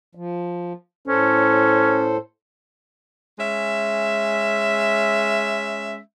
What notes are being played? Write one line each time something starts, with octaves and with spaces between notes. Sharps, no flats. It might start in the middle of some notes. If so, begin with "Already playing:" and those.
F3
A2 C#4 A4 C5
G#3 C#4 E5